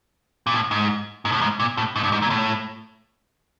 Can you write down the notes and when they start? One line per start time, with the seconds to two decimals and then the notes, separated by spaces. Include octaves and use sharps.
0.47 A#2
0.54 A2
0.71 G#2
1.25 G#2
1.32 A2
1.41 G#2
1.60 A#2
1.77 A2
1.96 G#2
2.03 G2
2.12 G#2
2.22 A#2
2.30 A2